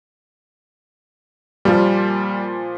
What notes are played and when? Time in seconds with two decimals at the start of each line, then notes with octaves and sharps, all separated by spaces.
1.65 A#2 F3 G3